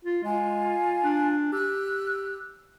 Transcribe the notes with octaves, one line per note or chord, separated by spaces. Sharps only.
F4
G#3 F4 G#5
D4
G4 E6 F#6